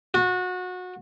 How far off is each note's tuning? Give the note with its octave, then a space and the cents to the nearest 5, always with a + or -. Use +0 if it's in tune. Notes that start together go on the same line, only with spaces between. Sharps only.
F#4 -25